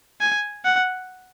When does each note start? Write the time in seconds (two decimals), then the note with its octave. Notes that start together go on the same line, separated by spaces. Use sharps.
0.21 G#5
0.65 F#5